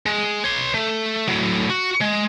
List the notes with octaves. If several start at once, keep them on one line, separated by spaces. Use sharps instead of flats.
G#3
C#5 C6
A3
A2 F#3
F#4
G#3